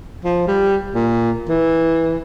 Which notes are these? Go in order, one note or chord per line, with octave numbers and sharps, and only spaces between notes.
F3
G3
A#2
E3